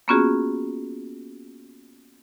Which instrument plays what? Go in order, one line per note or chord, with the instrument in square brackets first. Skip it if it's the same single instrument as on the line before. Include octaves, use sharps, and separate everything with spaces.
[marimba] A#3 B3 C#4 F4 F#4 G#4